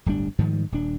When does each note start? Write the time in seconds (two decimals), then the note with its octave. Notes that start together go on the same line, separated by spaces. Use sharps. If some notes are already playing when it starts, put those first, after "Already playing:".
0.06 D1 G1 G3 D4
0.39 G#2 D#3 F3 G3
0.72 D#1 D4